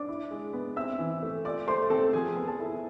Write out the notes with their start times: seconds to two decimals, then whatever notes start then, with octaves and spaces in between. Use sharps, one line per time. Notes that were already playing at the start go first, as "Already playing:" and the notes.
Already playing: D4 D5 D6
0.08 E4
0.31 G#3
0.53 B3
0.76 C4 E5 E6
0.99 E3
1.23 A3
1.44 F4 D5 D6
1.67 A3 C5 C6
1.90 C4 A4 A5
2.13 F3 G#4 G#5
2.36 B3
2.47 A4 A5
2.59 E4